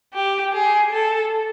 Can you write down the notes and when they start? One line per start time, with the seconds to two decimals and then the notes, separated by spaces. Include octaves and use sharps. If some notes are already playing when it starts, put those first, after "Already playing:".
0.13 G4
0.53 G#4
0.92 A4